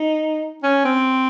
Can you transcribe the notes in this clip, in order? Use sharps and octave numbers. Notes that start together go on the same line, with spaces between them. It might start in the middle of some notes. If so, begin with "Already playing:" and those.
Already playing: D#4
C#4
C4